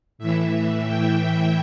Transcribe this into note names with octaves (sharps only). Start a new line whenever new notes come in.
A2 E3 E5
G5
E5